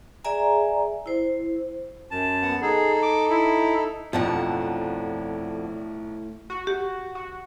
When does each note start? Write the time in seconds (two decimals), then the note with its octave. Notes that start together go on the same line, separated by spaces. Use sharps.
0.24 G#4 D5 E5 G#5 A#5
1.06 E4 C5
2.11 F#2 A5
2.42 B3 F#5
2.62 D#4 G#4 A4
3.02 D6
3.30 E4
4.13 B1 F2 A2 D3 F3 F#5
6.50 F#4
6.67 G4
7.15 F#4